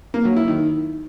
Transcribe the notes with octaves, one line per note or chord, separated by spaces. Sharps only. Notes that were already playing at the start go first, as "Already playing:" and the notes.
A#3
F#3
E4
D#3